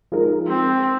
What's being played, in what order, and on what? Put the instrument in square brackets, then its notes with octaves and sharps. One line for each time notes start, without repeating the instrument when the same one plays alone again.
[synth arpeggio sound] F3 G#3 D#4 A#4
[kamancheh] C4